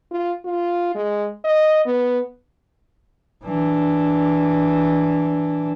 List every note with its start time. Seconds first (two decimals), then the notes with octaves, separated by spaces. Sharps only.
0.11 F4
0.45 F4
0.95 G#3
1.45 D#5
1.86 B3
3.45 E3 D4